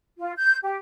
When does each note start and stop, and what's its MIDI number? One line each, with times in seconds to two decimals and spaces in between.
0.18 0.31 65
0.35 0.55 91
0.63 0.77 67